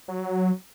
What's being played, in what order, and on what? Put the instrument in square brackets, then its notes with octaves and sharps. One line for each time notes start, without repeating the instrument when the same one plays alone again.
[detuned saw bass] F#3